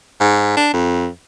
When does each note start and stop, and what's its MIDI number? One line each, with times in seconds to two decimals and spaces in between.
0.21 0.57 44
0.57 0.69 62
0.73 1.07 41